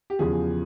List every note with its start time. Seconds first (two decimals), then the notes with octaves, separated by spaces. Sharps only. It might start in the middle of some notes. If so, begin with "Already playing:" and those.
0.10 G4
0.19 E2 C#3 F3 G#4